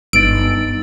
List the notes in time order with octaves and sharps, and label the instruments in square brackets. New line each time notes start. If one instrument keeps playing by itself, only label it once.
[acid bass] G1 [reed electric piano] G2 B3 D#4 [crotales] E6 A6 [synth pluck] D7